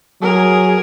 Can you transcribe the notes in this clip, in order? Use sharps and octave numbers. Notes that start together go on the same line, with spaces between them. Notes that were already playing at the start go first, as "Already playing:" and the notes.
F#3 G#4 A#4